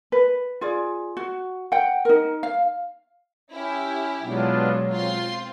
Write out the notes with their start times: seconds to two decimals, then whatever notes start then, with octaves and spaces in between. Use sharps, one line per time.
0.12 B4
0.61 F4 G#4 D5
1.17 F#4
1.72 F#5 G5
2.05 D#4 A#4
2.43 F5
3.51 C#4 E4 G4
4.23 B2 F#3 G#3 B3 D4 F4
4.91 C4 F4 C6